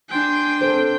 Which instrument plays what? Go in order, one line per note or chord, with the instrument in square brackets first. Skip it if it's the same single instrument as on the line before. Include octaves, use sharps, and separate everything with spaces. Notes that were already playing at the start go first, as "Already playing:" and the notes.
[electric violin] D4 G5 [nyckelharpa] G#5 C6
[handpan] C4 A4 C5